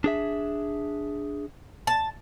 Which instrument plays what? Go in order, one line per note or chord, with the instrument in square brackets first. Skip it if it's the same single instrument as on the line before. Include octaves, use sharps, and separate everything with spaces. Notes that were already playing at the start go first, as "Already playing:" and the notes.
[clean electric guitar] D4 G#4 E5
[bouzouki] A5